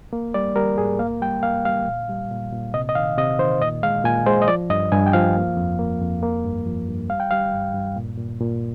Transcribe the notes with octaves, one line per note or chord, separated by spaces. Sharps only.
A#3
G3 D5
G3 A#4
G#2 G#4
A#3 F5
G3 G5
A#3 F5
G3 F5
A#2
G3
A#2
A#2
C3 D#5
D#5
D#3 F5
C3 D#5
D#3 C5
A#2 D#5
G#3 F5
A#2 G#5
G#3 C5
D#5
F3 D5
G2 D#5
G2 G#5
G5
F3 F5
A#3
F2
A#3
F2
A#3
G2
F3
G2
G3 F5
G5
G3 F5
G2
G2
A#2
A#2
A#2